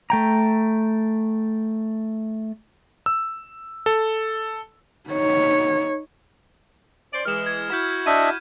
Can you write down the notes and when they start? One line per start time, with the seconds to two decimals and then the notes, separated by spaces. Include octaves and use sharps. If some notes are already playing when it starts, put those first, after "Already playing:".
0.10 A3 G5 A#5
3.06 E6
3.86 A4
5.09 D#4 C#5
7.13 C#4 C5 D5
7.25 E3 G#3 F6 E7
7.46 G#6
7.70 E4 F#4 G6 B6 E7
8.06 D4 D#5 E5 G6 D#7